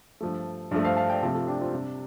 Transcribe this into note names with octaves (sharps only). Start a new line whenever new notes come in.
G2 F3 A3
G2 F3 A3 D4
C5 F5
F5 A5
D5 G5
C3 F3 A3 F4 A4
F4 A4
D4 G4
C4 F4
C3 G3 D4